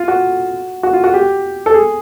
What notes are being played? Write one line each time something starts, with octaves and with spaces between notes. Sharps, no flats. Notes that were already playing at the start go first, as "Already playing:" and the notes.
Already playing: F4
F#4
F#4
F4
F#4
G4
A4
G#4